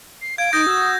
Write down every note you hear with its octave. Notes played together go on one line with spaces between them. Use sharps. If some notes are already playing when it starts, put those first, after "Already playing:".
C7
F5 G#6 D7
D#4 D#6 G6 A#6
F#4 E6